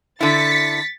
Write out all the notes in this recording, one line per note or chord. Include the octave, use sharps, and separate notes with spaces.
D3 E4 A6 B6 C#7